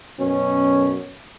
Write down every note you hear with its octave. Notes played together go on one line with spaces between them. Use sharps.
F#2 B2 C#4